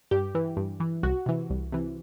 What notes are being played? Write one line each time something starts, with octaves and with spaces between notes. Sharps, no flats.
G2 G4
E3
G2
E3
C2 F#4
C3 E3
C2
C3 E3